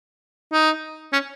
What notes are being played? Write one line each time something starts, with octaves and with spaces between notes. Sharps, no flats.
D#4
C#4